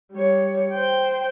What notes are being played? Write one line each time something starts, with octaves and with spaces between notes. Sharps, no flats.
G3 C#5
C5 G5